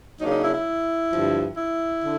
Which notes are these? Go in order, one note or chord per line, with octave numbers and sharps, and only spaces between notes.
C#3 F#3 A#3 D4 D#4
D#4
E4
E4
G2 D3 F3
E4
D3